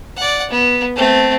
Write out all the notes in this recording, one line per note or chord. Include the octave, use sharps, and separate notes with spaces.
D5 F#5
B3
A3 C4